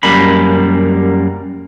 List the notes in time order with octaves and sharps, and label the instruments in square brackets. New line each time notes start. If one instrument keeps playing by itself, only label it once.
[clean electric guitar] F#2 G3 A#3 B5